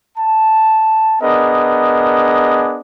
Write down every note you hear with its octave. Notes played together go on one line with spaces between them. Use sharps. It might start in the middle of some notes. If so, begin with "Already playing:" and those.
A5
B3 D4 G#4 A#4 D#5